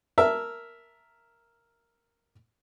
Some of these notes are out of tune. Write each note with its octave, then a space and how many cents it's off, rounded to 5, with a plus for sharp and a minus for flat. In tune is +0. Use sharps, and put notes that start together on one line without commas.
A#4 +0 E5 +0 A5 +0